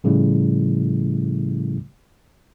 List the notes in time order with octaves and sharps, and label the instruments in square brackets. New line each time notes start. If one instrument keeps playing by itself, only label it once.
[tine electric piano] A2 C#3 F3 G3 A3 E4